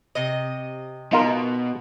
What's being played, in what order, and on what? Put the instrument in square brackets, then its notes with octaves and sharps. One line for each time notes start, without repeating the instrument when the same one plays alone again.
[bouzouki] C3 D#5
[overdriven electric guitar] B2 [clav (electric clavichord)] D#4 F4 A#4